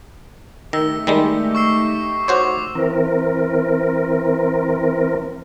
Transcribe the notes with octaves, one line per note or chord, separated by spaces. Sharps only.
D#3 A3 D#4 G4 E6 A#6
D#3 G3 G#3
C#6 E6 C7
F#4 C5 C#5 C#6 D6
E3 C4 A#4